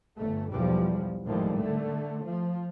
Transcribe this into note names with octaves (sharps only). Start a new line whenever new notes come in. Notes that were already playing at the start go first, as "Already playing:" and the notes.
G1 A3
B1 E2 F3 G3
G#1 D#2 A2 F3 G3 G#3
D3 A3
F3